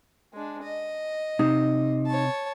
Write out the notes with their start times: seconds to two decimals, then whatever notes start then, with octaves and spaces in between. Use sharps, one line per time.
0.33 G#3 D4
0.63 D#5
1.39 C3 D#4
2.06 C#5 A5